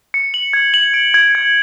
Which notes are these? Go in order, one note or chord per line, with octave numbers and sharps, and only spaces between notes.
C#7
F#7
G#6
F#7
D7
G#6
G#6